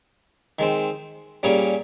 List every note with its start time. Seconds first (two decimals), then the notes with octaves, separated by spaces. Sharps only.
0.59 D#3 G#3 C4
1.43 A#2 G3 A#3 C#4 G#4